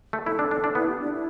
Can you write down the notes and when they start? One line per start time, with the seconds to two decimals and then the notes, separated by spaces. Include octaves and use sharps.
0.13 A3
0.26 E4 A4
0.39 D4
0.51 D4
0.64 D4
0.75 B3 E4
0.88 G4
1.00 D4
1.13 E4